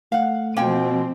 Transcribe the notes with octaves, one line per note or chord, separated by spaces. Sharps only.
A3 F5 F#5
B2 F3 A#3 C4 G5 G#5